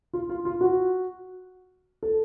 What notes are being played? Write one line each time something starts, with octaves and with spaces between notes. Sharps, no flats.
F4
F4
F4
F#4
A4